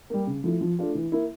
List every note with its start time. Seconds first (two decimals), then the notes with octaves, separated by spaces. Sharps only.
0.10 G3 A#3
0.27 C#3
0.44 F3 A3 E4
0.61 F3
0.79 A3 D4 F4
0.95 E3
1.12 A#3 E4